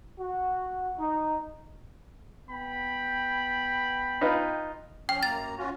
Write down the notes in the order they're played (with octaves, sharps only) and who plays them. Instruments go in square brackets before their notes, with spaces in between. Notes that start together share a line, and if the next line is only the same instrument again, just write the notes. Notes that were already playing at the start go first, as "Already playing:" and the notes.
[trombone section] F#4
D#4
[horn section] B3 G5 B5
[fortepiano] D#4 F4 B4
[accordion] F3 C#4 F6 [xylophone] G5
[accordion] F#2 A#3 A#5 [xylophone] A6
[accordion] C#4 F4 F#4